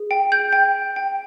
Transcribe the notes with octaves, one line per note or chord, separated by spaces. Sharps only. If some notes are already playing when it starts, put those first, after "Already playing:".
Already playing: G#4
G5
G6
G5
G5